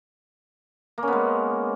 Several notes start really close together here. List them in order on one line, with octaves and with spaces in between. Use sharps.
A#3 C#4 B3 G#3